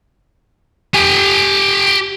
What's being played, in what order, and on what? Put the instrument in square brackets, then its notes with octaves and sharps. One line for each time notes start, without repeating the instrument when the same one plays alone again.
[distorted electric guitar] G4 G#5